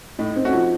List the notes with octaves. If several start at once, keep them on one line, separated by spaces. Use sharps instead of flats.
A2 D#4
C4
A3 C#4 F#4
F3